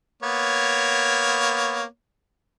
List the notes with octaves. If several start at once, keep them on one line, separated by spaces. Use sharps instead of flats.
A#3 B3 C#5